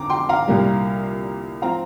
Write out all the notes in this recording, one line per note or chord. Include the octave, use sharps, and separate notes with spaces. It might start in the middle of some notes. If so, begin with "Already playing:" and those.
Already playing: G1 F2 F3 A#5 D6
G5 C6
F5 A#5
C2 A#2 G3
F3 C4 F5 A#5